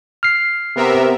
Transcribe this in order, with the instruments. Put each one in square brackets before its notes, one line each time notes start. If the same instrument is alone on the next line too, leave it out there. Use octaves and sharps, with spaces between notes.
[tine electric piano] F6 C7
[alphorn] C3 [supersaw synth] B3 A#4 E5